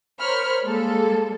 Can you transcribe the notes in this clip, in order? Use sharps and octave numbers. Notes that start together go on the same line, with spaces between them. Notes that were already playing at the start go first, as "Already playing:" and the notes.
A#4 C5 C#5 B5 F6
G3 G#3 A#3 A4